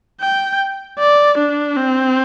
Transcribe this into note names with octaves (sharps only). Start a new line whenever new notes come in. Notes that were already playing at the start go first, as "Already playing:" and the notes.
G5
D5
D4
C4